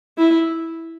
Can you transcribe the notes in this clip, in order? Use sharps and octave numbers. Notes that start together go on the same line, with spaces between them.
E4